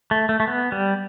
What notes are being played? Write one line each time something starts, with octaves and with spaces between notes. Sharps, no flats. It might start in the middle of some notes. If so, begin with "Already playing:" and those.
A3
A3
A3
B3
G3